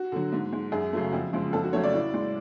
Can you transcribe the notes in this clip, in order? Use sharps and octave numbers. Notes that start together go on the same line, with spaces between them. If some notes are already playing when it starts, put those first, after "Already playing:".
Already playing: F#4
D3 F#3
G#2
G#3
F#2 G#4
C#3 F#3 A3
F2
C#3 F3 G#3
F2 A4
F#4
C#3 F#3 A3 C#5
D5
A2
G#3